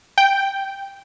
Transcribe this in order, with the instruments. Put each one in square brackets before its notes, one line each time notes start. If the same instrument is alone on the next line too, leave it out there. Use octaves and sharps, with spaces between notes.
[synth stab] G5